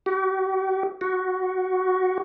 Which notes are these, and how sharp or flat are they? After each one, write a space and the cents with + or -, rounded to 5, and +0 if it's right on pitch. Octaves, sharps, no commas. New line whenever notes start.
F#4 +45
F#4 +5